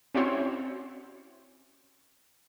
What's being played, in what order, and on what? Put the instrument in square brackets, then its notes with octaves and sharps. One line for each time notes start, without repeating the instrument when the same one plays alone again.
[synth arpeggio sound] C4 C#4 E4 F#4 C5 C#5